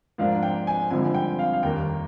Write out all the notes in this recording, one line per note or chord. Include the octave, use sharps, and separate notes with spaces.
G#2 F3 A#3 D4 F4 F5
G5
G#5
G#1 G2 D3 F3 C4 G#5
G5
F5
F5
F1 D#2 D#3 G3 A#3 G5